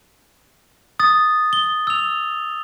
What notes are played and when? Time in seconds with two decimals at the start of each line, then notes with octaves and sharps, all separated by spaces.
1.00 D#6 A6
1.53 G7
1.87 E6 F7